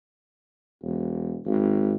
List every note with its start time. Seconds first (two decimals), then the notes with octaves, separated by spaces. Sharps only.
0.83 E1
1.46 G#1